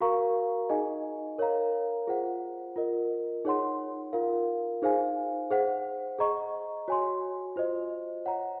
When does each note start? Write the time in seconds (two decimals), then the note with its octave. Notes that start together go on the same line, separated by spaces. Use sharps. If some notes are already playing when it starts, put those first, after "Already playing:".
0.01 F#4 A#4 F5 A#5 C#6
0.69 D#4 G#4 D#5 G#5
1.38 A#4 C#5 F5 A#5
2.07 F4 G#4 C5 F#5
2.76 F4 A#4 D#5
3.45 D#4 G#4 C#5 F#5 C6
4.13 F4 A#4 F5
4.82 D#4 G#4 C5 F5 G#5
5.51 G#4 C5 F#5
6.19 G#4 D#5 A#5 C#6
6.88 F#4 C#5 G#5 C6
7.56 F4 C5 D#5
8.25 C#5 F#5 A#5